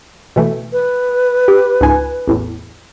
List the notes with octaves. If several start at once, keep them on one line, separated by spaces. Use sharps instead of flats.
B2 E3 A3
B4
G4
C#2 G#2 G#5
A1 E2 A2